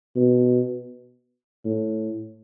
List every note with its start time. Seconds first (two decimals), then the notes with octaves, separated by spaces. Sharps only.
0.16 B2
1.65 A2